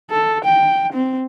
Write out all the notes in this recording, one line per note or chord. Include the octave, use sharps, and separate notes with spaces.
A4
G5
C4